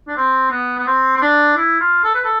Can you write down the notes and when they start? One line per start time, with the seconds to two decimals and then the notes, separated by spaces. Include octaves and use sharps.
0.08 D4
0.17 C4
0.51 B3
0.78 B3
0.87 C4
1.16 C4
1.22 D4
1.57 E4
1.80 F4
2.04 A4
2.15 B4
2.25 A4